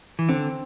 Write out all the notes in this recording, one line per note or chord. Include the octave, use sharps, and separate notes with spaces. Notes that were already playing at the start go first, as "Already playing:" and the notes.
E3
D3 C4